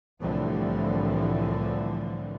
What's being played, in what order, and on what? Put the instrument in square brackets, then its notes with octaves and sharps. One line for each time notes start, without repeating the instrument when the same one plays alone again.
[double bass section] C2 A2 D3 E3 F3 G3